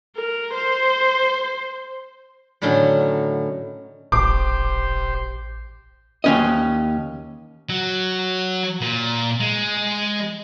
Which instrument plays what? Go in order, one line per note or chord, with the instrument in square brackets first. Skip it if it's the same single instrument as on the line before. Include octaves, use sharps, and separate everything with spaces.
[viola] A#4
C5
[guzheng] A2 D3 D#3 F#3 C#4 F#4
[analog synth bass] D#1 [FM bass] A1 [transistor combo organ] G4 C5 [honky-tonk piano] D6
[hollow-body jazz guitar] D#2 C#4 D#5
[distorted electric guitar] F#3
A#2
G#3